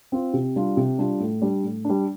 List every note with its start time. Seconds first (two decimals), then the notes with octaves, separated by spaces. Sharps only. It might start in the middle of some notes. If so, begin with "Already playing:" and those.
0.12 C4 F4
0.34 C3
0.56 G3 D4 F4
0.77 C3
0.98 G3 D4 F4
1.20 A2
1.42 G3 D4
1.64 A2
1.85 G3 D4